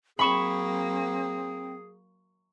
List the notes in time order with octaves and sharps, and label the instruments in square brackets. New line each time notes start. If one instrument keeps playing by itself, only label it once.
[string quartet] F#3 A#3 [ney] C4 [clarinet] G#4 [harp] B5 C#6 E7